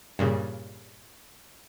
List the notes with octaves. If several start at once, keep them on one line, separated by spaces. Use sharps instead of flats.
G2 A#2 C#3